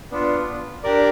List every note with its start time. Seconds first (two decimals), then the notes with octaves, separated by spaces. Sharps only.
0.11 B3 D4 F4
0.83 D4 G4 A#4 D5